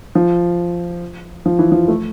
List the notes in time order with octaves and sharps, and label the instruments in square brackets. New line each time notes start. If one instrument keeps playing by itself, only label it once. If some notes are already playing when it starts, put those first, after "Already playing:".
[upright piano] F3
F3
E3
F3
A3